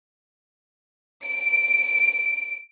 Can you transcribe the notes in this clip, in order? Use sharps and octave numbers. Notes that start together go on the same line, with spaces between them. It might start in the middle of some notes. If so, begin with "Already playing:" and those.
D7